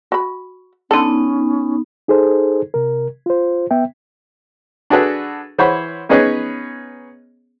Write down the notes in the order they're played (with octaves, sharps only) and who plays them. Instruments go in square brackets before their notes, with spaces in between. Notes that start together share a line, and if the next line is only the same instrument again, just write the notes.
[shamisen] F#4 B5
[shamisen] D3 A4 [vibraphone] B3 D#4 [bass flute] C#4
[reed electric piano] D#4 G#4 A4 C5
C3 A#4
F4 C5
B3 E5 G5
[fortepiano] D4 F#4 G#4 A4 B4
E3 C5 C#5 F#5 B5
B3 C#4 D#4 G#4 B4 C#5